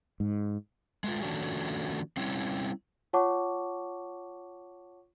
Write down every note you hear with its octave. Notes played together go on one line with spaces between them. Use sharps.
G#2
G#3 A3 F4
D#3 F3 A3 C#4 D4 F#4
G3 C4 C#4 E4
F4 C#5 F#5 A5 C#6 D6